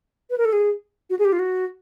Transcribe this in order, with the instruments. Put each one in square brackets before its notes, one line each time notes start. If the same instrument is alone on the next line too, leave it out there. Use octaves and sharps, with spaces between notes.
[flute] B4
A#4
A4
G#4
F#4
G#4
G4
F4
F#4